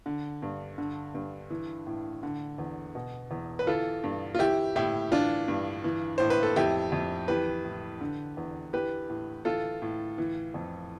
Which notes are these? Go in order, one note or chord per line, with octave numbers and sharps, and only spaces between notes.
D3
G2
D3
G2
E3
A2
D3
E2
B2
E2
B4
E3 F4 A4
G2
F4
E3 E4 G4
A2 E4 G4
E3 D4 F4
G2
E3
A2 C5
B4
A4
F2 E4 G4
F2
E3 G4 B4
A2
D3
E2
E3 G4 B4
A2
E3 F4 A4
A2
E3
F2